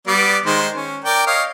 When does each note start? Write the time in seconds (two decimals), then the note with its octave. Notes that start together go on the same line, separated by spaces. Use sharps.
0.07 G3 B3 D5
0.46 D#3 G#3 C5
0.76 C#4
1.04 A#4 D5 G5
1.27 C#5 D#5 F5